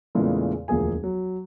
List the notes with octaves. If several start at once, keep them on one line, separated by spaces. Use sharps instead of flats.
E2 A#2 C#3 E3 G#3 A3
E1 D2 F3 A#3 G#4 G#5
F#3